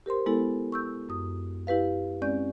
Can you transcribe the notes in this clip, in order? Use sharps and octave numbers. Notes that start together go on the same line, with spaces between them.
G4 A#4 C5 C6
G#3 B3 E4 A4
C#6 E6 G6
F#2 D#6
E4 G4 B4 F5
G#3 C4 C#4 D5 G6